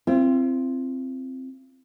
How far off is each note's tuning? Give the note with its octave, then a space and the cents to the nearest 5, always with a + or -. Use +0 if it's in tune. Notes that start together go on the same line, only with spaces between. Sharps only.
C4 +0 F4 -45